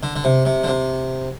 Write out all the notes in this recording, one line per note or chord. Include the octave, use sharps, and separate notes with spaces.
D3
D3
C3
C3
D3
C3